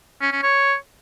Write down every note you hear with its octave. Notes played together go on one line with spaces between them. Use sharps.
C#4
C#4
C#5